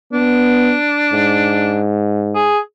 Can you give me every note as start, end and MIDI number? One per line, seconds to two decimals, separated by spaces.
0.13 0.76 59
0.13 1.83 62
1.13 2.52 44
2.35 2.58 68